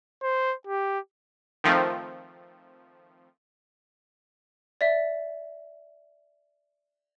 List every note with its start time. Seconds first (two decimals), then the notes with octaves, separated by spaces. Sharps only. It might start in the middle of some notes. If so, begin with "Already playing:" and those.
0.23 C5
0.67 G4
1.64 D#3 F3 A3 C4
4.81 D5 E5